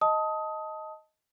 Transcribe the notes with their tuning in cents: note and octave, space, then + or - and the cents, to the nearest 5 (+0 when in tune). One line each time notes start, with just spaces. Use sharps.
D#5 +5 A5 +0 D#6 +20